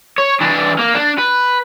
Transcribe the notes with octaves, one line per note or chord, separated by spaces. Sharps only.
C#5
E3 D4
A#3
D4
B4